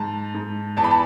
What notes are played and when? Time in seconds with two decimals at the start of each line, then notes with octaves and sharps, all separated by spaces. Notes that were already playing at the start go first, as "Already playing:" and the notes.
Already playing: G#2 A5
0.34 G#2
0.77 E2 A5
0.84 B5
0.91 A5